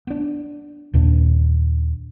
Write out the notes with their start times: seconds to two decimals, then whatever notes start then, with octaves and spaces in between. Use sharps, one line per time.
0.07 B3 D4
0.94 D#2 A#2 D4